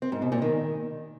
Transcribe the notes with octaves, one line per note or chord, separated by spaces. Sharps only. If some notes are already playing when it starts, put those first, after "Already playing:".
C4
G#2
B2
A#2
D#3